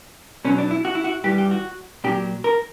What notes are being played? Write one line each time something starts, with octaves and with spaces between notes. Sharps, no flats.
B2 F#3 C#4
D4
E4
F#4
E4
F#4
G2 E3 G3 G4
G4
F#4
A#2 F#3 G4
A#4